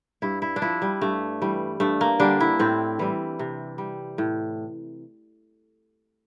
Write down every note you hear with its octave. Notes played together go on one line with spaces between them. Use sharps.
G2 E4
E4
D4
F3 E4
G3
G2 A3
E3 G3
G2 A3
A#3
D3 G3 D4
E4
A2 C4
E3 G3
C3
G3
A2